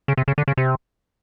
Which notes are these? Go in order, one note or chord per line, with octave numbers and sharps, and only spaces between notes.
C#3
C3
C#3
D3
C#3
C3